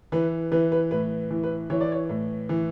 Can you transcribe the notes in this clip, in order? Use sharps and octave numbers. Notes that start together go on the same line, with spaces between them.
E3 B4
E3 B4
B4
A2 B4
E3
B4
E3 C#5
D5
C#5
A2
E3